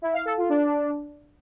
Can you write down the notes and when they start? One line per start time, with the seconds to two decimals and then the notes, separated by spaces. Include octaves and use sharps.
0.02 E4
0.14 F5
0.25 A4
0.37 F4
0.49 D4